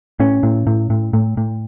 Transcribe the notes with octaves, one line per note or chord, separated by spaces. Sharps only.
A2 C#4
A2
A2
A2
A2
A2